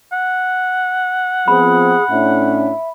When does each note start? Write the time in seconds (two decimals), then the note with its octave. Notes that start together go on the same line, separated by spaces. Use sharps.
0.12 F#5
1.48 F3 B3 C4 G#4 B5
2.10 A2 C#4 D4 E5